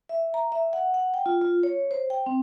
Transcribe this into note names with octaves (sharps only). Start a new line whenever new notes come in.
E5
A#5
E5
F#5
F#5
G5
F4
F4
C#5
C5
G5
C4